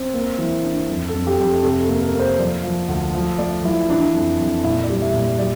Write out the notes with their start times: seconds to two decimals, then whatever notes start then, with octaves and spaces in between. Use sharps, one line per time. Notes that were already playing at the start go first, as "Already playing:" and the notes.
Already playing: C4
0.14 A#3
0.38 E3
0.64 D4
0.89 F2
1.08 A4
1.14 F2
1.27 G4
1.39 F2
1.46 A4
1.63 C3 A4
1.83 A4
1.88 A#3
2.01 A#4
2.14 A#3
2.19 C5
2.39 F3 D5
2.64 F3
2.88 D2
3.14 F3
3.38 A3 D5
3.63 F3 E4
3.89 E3 D4
4.14 F2
4.39 F2
4.64 A#2 E4
4.83 D5
4.90 G3
5.02 E5
5.14 A#2
5.21 D5
5.39 G3 D5